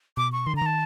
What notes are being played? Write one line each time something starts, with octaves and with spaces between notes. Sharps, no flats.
B2 D6
C#6
D#3 C6
D3 A#5
D#3 A5